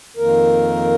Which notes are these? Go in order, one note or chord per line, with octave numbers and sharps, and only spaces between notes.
F2 D#3 A#3 A#4